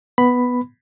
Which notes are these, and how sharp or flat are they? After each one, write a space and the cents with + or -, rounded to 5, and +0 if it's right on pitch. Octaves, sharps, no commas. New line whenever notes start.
B3 +0 B5 +5